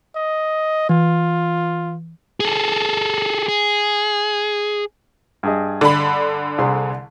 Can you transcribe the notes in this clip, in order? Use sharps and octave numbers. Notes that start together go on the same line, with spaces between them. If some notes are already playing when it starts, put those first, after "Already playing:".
D#5
E3 F4
G#4 A4
G#4
G2 G#4 D#5
D3 B5
C2 G#4 C6